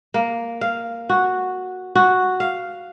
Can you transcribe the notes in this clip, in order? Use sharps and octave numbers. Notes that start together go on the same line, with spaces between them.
A#3
F5
F#4
F#4
F5